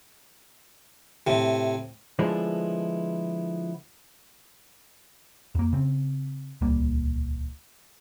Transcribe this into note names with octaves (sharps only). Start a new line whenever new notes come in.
A2 C3
D3 F3 G#3 A3 B3 E4
F2 A#3
C#3 C4
D#1 C#2 G3 A#3